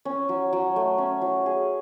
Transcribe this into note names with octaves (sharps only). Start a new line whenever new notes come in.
C#4
F#3
F#3
A3
C#4
F#3
G#4